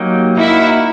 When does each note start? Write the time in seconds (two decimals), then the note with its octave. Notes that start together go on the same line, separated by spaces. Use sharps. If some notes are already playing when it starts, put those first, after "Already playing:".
Already playing: F#3 A#3 D#4 G4
0.37 A#3 D#4 E4 F#4 A#4